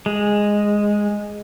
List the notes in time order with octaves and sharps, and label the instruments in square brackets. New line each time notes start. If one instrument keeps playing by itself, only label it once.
[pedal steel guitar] G#3